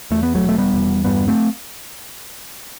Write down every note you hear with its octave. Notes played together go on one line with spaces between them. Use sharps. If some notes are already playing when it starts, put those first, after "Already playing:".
E2 A3
B3
F#3 A3
E1
A3
G3 B3
E2
G2 G3 B3
A3 C4